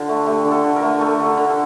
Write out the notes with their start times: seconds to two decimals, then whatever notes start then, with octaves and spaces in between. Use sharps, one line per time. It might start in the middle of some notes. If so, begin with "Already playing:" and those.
Already playing: D3 F4
0.09 A3
0.26 A3 G4
0.45 D3
0.51 A4
0.64 D3
0.76 A#4
0.82 A3
1.01 A3 A4
1.20 D3
1.26 A#4
1.37 D3
1.50 A4